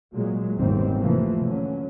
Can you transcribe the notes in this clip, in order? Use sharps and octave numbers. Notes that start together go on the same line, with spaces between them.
A#2 F#3 G#3
F#1 E2 G#2 D#3 G3 C4
C3 E3 F3 A3 A#3
D3 F#3 C#4